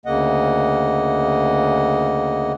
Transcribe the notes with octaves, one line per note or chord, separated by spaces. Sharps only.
D2 C#3 A#3 D#5 F#5